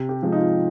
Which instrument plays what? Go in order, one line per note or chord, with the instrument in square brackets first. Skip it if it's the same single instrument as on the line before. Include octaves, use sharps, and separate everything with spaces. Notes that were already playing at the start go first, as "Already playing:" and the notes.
Already playing: [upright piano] C3
G4
F3 G#3
D#4
F4